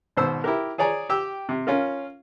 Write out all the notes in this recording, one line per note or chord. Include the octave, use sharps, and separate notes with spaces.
G#1 B2 C5 E6
E4 G4 A#4
G#4 C#5 D5 G#5 A#5
G4 G5 E6
C3
C#4 F4 A#4